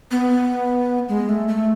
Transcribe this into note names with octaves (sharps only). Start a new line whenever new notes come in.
B3
G#3
A3
A3